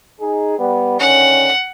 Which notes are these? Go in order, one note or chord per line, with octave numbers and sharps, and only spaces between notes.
D#4 G#4
G3 B3
D3 D#3 C#4 F#5